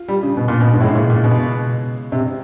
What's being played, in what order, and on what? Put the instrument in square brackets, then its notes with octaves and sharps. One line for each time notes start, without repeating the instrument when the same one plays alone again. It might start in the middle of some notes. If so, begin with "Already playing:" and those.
Already playing: [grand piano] F4
[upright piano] G3
C#3
B2
A#2
B2
G#2
[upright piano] A2 [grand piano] C#3 E3 G#3
[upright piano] A#2
A#2
B2
C3